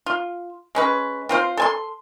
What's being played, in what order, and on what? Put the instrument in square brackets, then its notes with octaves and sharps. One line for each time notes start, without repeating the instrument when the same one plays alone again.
[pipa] F4
G#3 C#4 B4
C4 F4 C5
A4 G#5 C6